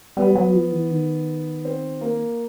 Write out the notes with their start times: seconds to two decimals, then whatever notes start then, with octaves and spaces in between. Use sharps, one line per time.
0.17 G3 B3
0.35 F#3
0.54 F3
0.72 E3
0.91 D#3
1.65 C4
2.01 A#3